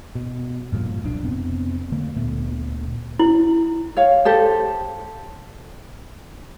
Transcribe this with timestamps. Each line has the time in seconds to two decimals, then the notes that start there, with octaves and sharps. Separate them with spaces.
0.15 B2
0.73 G2 A#2 D3 F3
1.03 E1 B1 B2 D4
1.23 F1 B3 C4
1.92 D3 A3 A#3
2.16 D2 A#2 A3 B3
3.19 E4
3.97 C#5 F5
4.25 G4 A4 C5